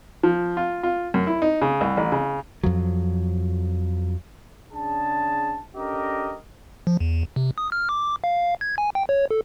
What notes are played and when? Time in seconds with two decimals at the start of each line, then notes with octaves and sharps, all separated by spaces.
0.23 F3
0.57 F4
0.83 F4
1.14 F#2
1.27 E4
1.42 D#4
1.62 C#3
1.81 C2
1.97 A1
2.12 C#3
2.63 F2 F3 F#3
4.71 C#3 D4 G#4 A5
5.75 C#4 D4 G4 A4 A#4 D#5
6.87 F3
7.00 E2
7.36 C3
7.58 D#6
7.72 F6
7.89 D6
8.24 F5
8.61 G#6
8.78 G#5
8.95 G5
9.09 C#5
9.31 A4